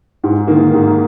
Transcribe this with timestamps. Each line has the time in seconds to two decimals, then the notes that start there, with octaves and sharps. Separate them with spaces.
0.24 G#2
0.48 D#3 A#3
0.73 G#2